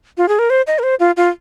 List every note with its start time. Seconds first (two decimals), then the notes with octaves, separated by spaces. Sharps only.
0.17 F4
0.28 G#4
0.39 A#4
0.50 C5
0.67 D#5
0.79 A#4
0.83 C5
1.00 F4
1.17 F4